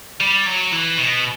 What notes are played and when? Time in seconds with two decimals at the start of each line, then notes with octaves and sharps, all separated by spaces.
0.21 G3
0.47 F#3
0.73 E3
0.98 B2